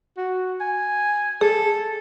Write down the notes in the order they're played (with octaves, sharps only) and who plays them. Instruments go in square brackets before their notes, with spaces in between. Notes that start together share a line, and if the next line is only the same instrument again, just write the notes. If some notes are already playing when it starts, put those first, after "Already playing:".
[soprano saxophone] F#4
G#5
[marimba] G#4 [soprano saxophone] A4